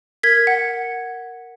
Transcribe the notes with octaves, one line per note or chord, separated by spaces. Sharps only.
A#4 G#6 B6
F#5